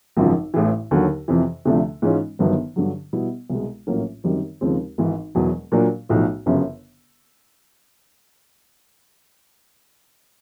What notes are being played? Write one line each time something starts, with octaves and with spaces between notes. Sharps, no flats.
G#1 F#2 C#3 F3
A1 A2 E3
D#2 D3 F#3
F2 C3 E3
D2 C3 F3 A3 D4
G#2 E3 G#3 C#4 F4
G1 G2 D#3 F#3 B3
G2 D3 F#3
B2 G3 B3 E4
C2 B2 G#3
A#1 A2 F#3 A#3 C#4
F#2 D#3 G3 C4
D#2 C#3 F3 G#3 C4
G#1 G#2 E3
E1 E2 B2 F#3
A#2 F#3 A#3 D4 F#4
B1 A2 F3
G1 F#2 C#3